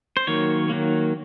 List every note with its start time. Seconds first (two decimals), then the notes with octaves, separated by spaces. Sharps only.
0.17 C5
0.27 D#3 F#3 A#3 C#5
0.70 D#3 F#3 A#3